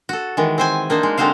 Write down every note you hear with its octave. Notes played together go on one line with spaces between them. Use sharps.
F#4 A4
D#3 E3 G#3
C4 C5 G#5
A#3 D4 D#4 C5
G#3
D3 G#3 C4 F#4 C5 F5